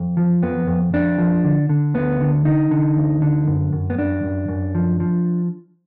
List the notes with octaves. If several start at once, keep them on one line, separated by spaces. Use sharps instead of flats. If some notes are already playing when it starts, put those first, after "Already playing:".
Already playing: F2
F3
F2 B3
F2
F2 D4
F3
D3
D3
D2 B3
D3
D3 D#4
D3
D2
D3
F#2
F#2
B3
F#2 D4
F#2
F#2
F3
F3